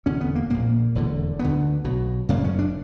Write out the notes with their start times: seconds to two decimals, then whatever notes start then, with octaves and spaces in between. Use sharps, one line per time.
0.06 E1 E2 D3 C#4
0.21 B3
0.35 A#3
0.50 A#1 A#2 A#3
0.95 E1 E2 D3
1.39 D2 D3 B3
1.84 B1 B2
2.29 F#1 F#2 C#3 A#3
2.44 C#4
2.59 D4